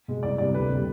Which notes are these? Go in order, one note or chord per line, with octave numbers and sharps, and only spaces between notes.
B2 G#3
C2 D5
C3 G3 D5
D2 B4
C3 G3